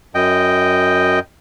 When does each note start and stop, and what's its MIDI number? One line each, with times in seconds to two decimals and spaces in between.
0.15 1.19 42
0.15 1.19 75
0.15 1.19 79